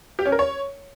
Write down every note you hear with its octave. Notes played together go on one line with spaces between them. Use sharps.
G4
C#4
A#4
C#5